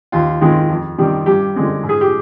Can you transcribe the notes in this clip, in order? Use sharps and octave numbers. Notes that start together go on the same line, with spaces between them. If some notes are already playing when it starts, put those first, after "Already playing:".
D#2 F4
D#3 G#3 C4
F2
C3 D#3 G3
G2 G4
D3 G#3 C4
G#2
G#4
G4